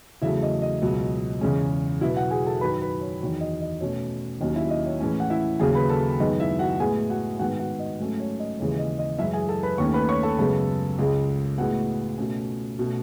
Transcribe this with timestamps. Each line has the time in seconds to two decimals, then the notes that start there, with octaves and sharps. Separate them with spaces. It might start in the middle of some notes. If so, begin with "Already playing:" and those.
0.22 E2 C#3 F#3 A3 E4 E5
0.42 D#5
0.62 D#5
0.82 C#2 B2 F#3
1.41 E2 C#3 G#3 C#4
2.01 B2 F#3 B3 E4 E5
2.16 F#4 F#5
2.31 G#4 G#5
2.47 A4 A5
2.61 F#2 D#3 F#3 B4 B5
2.81 B4 B5
3.01 C#5
3.21 E2 D#3 F#3 C#5
3.40 D#5
3.61 D#5
3.81 B2 A3 C#4 C#5
4.40 D#2 D#3 F#3 C#4 D#5
4.56 E4 E5
4.70 D#5
4.86 C#5
5.00 A2 E3 G#3 C#4
5.20 F#5
5.30 E4 E5
5.60 D#2 C#3 F#3 G#4 G#5
5.75 B4 B5
5.89 A4 A5
6.20 F#2 D#3 G#3 B3 D#5
6.40 E4 E5
6.59 F#4 F#5
6.80 A2 G#3 B3 G#4 G#5
7.10 F#4 F#5
7.39 G#2 D#3 G#3 B3 F#4 F#5
7.59 F#4 F#5
7.79 D#5
8.00 G#2 F#3 A3 C#4
8.20 C#5
8.39 D#5
8.59 D#2 C#3 E3 G#3 C#5
8.79 D#5
8.99 D#5
9.18 F#2 E3 G#3 E4 E5
9.33 G#4 G#5
9.48 A4 A5
9.63 B4 B5
9.78 D#2 D#3 A3 C#4 C#5 C#6
9.94 B4 B5
10.09 C#5 C#6
10.23 A4 A5
10.39 F#2 C#3 G#3 B3
10.98 C#2 C#3 G#3
11.58 A2 G#3 B3 F#4 F#5
12.18 B2 A3 C#4
12.79 B2 A3 C#4